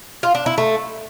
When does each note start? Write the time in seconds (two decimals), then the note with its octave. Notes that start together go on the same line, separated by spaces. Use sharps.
0.23 F4
0.35 D4
0.46 E4
0.58 A3